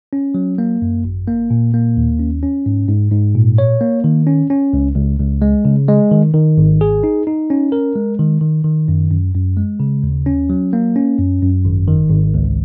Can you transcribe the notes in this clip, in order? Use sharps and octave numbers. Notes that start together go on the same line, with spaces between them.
C#4
F#3
A#3
F#2
G#1
A#3
A#2
A#3
D#2
C#4
C#4
G#2
G#2
G#2
A#2
C#5
A#3
D#3
C#4
C#4
C#2
C#2
C#2
G#3
C#3
G#3
D#3
D#3
G#1
G#4
D#4
D#4
C#4
A#4
G#3
D#3
D#3
D#3
F#2
F#2
F#2
G#3
C#3
D#2
C#4
F#3
A#3
C#4
F#2
F#2
G#1
D#3
G#1
C#2